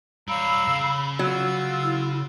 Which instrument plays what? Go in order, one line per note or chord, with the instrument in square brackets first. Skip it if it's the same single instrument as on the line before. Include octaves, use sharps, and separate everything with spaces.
[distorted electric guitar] G3 C#5 [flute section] F5 A#5 E6 [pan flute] B5
[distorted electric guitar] C#3
[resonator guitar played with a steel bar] F#3 [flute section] F4 E6
[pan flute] E4